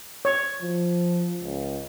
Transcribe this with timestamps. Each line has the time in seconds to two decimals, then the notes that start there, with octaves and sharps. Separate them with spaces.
0.25 C#5
0.62 F3
1.41 C#2